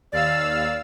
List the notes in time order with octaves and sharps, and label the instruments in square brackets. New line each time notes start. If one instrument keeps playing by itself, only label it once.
[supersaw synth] D#2 F5 E6 [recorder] D5